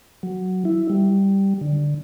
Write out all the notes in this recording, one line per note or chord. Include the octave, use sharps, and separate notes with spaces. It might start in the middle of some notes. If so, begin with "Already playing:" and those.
F#3
E4
G3
D3